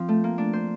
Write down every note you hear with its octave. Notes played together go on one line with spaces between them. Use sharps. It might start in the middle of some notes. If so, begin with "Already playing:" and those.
Already playing: F3 C4
A3
A#3
D4
C5